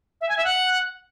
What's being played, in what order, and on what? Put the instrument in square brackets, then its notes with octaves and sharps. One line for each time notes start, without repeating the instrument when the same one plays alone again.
[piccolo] E5
G#5
E5
F#5